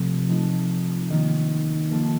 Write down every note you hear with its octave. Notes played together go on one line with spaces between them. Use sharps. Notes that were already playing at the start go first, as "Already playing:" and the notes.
Already playing: C3 F3 A3 C4
F3 A3 D#4
D#3 A#3 D#4
F3 A#3 F4 A4